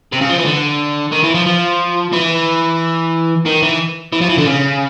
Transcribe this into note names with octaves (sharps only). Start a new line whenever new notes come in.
C3
C#3
F3
E3
D3
D#3
E3
F3
F3
E3
D#3
E3
E3
F3
E3
D3
C#3